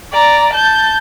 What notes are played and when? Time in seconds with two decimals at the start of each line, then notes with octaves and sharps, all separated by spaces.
0.12 D5 A#5
0.53 A5 G6